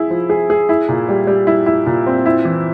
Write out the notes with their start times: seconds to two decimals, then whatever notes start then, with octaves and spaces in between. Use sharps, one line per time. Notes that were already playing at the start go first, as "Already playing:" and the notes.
Already playing: E4 G#4
0.10 F3
0.30 G#4
0.50 G#4
0.69 E4
0.89 A#2
1.09 G3
1.27 G3
1.47 E4
1.66 E4
1.86 A#2
2.07 C4
2.26 E4
2.45 E3